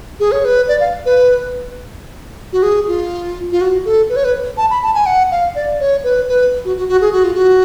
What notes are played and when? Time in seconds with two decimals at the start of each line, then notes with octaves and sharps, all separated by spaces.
0.20 G#4
0.32 C#5
0.45 B4
0.68 D5
0.80 F5
1.06 B4
2.53 F#4
2.63 G#4
2.88 F4
3.52 F4
3.61 F#4
3.85 A4
4.09 B4
4.16 C#5
4.24 B4
4.57 A5
4.70 B5
4.83 A5
4.94 G#5
5.06 F#5
5.31 F5
5.55 D5
5.80 C#5
6.04 B4
6.29 B4
6.65 F#4
6.77 F#4
6.88 F#4
7.01 G#4
7.12 F#4
7.24 F4
7.35 F#4